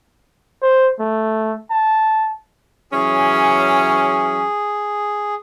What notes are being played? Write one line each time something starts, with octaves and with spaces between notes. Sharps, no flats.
C5
A3
A5
E3 F#3 C#4 G#4